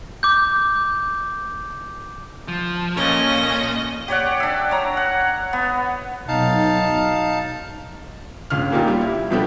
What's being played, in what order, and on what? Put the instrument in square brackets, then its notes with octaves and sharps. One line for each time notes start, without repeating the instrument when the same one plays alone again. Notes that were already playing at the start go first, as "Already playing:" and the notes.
[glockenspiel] D6 G6
[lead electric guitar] F3
[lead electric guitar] A#2 [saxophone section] A3 A#3 C#4 [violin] D#5
[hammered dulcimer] G4 C#5 D5 F#5
D4 E5
C#5 A#5
F#5
B3
[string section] B1 [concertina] D#4 F5 A5
[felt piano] G1 C#2 F6
A#2 A#3 D#4 F4 G4
G3
E4
B2 F3 G3 D4 G4 A4